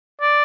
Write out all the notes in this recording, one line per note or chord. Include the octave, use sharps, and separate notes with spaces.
D5